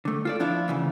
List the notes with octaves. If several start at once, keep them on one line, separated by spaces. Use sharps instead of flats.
D3 A3
F4 A4 D5
F3 D4 E4 F4
D2 C#3 E3